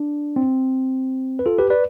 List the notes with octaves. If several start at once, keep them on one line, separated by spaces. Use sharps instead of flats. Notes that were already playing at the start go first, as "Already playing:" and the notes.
Already playing: D4
C4
B4
F4 A4
G4 B4
B4 D5